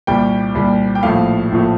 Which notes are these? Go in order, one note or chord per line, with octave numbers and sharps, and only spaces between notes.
C2 A#2 G3 G5
C2 A#2 G3
G5
A#1 A2 F3 A3 F5
A#1 A2 F3 A3